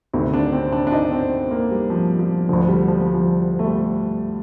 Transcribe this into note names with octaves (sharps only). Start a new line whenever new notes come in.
D2 C3 D#3
D4
C4
D4
D4
D#4
C4
A#3
G3
F3
F3
D2 D3 F3
G3
F3
G3
F3
A3
G3